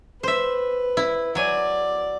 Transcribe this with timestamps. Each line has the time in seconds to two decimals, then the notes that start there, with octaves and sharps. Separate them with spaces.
0.23 B4 C5 E5
0.97 E4
1.35 F#3 D5 G#5